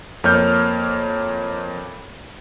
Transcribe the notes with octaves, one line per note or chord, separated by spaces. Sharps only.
F2 A#3 C#5 F6 G6